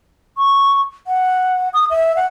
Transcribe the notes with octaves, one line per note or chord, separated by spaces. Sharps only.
C#6
F#5
D#6
E5
F#5